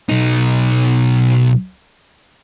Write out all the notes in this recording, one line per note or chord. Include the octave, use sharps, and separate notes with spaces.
B1 D#4